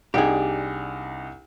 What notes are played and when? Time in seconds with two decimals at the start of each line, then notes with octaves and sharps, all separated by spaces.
0.14 C2 D4 D#4 G4 G#4